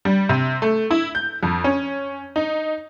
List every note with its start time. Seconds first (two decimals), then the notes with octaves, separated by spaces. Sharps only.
0.05 G3
0.29 C3
0.62 A3
0.91 E4
1.15 G6
1.43 F2
1.64 C#4
2.36 D#4